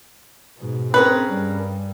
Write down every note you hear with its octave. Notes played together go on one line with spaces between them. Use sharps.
G#2 B2
C4 C#4 G#4 A#4 B4
G2 G3